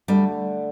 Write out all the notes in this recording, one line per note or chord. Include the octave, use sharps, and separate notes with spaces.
D3 G3 A3 D4